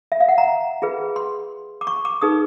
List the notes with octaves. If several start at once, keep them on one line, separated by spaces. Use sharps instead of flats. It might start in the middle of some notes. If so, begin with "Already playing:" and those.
E5
F5
F#5
A#5
F4 G#4 B4
C6
D6
C#6
D6
D#4 G#4 B4 D#6